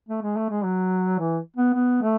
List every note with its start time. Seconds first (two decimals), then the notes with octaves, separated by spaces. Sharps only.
0.09 A3
0.22 G#3
0.37 A3
0.50 G#3
0.64 F#3
1.19 E3
1.56 B3
1.74 B3
2.02 A3